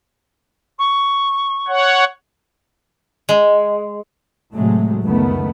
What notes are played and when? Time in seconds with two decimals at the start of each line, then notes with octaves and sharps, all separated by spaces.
0.78 C#6
1.68 C#5 F#5
3.29 G#3
4.55 A2 C3 F#3 G#3 A3
5.03 F#1 C#2 D#3 A3 B3